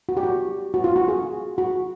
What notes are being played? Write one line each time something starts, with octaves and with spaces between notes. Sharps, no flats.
F#4
G4
F#4
F#4
F4
F#4
G#4
F#4